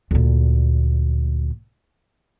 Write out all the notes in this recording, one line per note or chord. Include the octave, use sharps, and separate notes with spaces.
D2 A#2